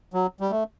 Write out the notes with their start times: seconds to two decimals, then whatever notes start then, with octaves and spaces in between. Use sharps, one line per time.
0.13 F#3
0.40 G3
0.50 A3